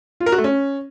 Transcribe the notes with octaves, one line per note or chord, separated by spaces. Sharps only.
F4
A#4
F#4
A3
C#4